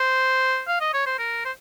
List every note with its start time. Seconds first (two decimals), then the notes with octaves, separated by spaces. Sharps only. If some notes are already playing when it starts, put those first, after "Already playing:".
Already playing: C5
0.68 F5
0.81 D#5
0.94 C#5
1.06 C5
1.19 A#4
1.45 C5